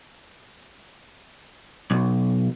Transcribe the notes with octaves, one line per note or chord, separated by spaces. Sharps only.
B1